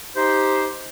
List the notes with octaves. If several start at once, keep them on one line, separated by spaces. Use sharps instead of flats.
D#4 G4 C5